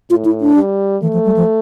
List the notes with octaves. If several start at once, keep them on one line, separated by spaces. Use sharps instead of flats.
A2 F4
E4
D4
G3
E3 A3
F3
G3
F3